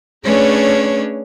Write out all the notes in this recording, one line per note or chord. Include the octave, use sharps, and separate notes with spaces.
A3 C#4 D4 G#4 B4 C#5